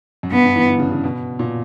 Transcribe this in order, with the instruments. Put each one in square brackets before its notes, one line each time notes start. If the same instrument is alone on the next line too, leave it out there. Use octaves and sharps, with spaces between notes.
[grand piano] F#2
[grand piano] G2 [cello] B3
[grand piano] G2
E3
D3
C#3
C#3
B2
A#2